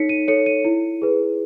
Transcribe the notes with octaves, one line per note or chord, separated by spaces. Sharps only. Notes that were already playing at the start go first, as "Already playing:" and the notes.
Already playing: D#4 A4 C#5 B6 C#7
D#7
A4 C#5 C#7
D#7
E4
G#4 B4